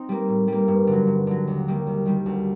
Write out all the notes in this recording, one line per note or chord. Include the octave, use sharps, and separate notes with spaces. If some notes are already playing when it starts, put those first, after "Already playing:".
Already playing: C4 D#4
G3 A#3
A2
G3 A#3
G2
D3 F#3
G2
D3 F#3
D#2
D#3 G3 A#3
D#2
D#3 G3 A#3
D2